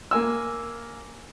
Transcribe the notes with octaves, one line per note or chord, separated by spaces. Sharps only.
A#3 A#4 G#5 E6